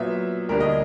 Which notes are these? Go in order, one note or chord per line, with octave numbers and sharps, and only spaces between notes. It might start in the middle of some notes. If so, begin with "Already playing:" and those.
Already playing: A#2 F#3 B3 E5
D2 D3 G3 A#3 A#4
D#5